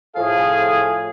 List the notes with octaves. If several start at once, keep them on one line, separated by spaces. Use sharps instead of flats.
A2 F3 G#4 F5